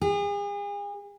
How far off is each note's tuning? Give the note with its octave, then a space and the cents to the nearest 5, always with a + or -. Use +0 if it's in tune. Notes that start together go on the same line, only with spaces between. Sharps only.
G#4 -40